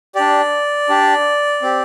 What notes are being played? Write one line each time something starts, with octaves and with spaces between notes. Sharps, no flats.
D4 G4 D5
D4 G4
C4 G4